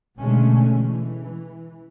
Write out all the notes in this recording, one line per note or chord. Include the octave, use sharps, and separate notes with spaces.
B2 D3 G#3 A3 C#4
E3